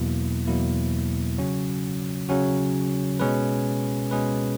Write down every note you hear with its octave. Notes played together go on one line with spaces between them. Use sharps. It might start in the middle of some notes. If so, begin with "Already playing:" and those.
Already playing: E2 B2 F#3 A#3 E4
E2 B2 F#3 A#3 E4
C#3 F#3 C#4 F#4
C#3 F#3 C#4 F#4
B2 G#3 C#4 G#4 B4
B2 G#3 C#4 G#4 B4